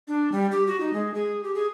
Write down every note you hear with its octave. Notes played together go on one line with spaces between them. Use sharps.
D4
G3
G4
F#4
D#4
G#3
G#4
G4
G#4